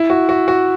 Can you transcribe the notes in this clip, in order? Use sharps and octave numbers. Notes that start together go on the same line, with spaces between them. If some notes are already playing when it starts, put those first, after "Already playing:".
Already playing: E4
F#4
F#4
F#4